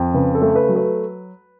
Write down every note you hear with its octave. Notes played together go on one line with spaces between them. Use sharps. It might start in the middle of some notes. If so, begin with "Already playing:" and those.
Already playing: F2
C#3 B4
A4
A3
B4
F#3
B4